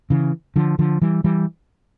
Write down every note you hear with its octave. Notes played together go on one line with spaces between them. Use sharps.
C#3 E3
D3 F3
D3 F3
E3 G3
E3 G3